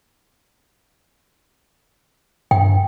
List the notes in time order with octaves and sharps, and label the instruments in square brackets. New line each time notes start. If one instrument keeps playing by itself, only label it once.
[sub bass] G2 [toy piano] G5